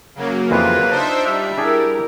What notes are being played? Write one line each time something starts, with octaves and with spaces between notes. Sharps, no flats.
C#3 F#3 A#3
F2 E3 B3 F4 B4
D4 D#4 F4 C5 E5 A5 A#5
G3 E5
D4 E4 G4 G#4 A#4 G5